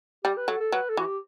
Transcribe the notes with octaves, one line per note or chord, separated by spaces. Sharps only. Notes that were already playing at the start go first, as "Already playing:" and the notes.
G3 G4
B4
F#3 A4
A4
F#3 B4
A4
E3 F#4
G4